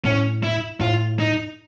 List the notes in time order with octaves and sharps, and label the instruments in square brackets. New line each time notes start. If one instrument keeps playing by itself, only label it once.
[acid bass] A2 [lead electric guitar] C#4
[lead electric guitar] E4
[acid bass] A2 [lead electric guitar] F4
[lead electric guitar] D#4